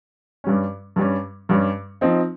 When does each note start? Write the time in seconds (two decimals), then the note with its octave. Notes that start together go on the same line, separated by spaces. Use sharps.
0.44 G2 G3 C#4
0.96 G2 G3 C#4
1.49 G2 G3 C#4
2.01 F3 C4 D#4